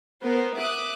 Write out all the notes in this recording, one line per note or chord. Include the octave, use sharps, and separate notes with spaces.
B3 A#4 C5
E5 D6 D#6 F#6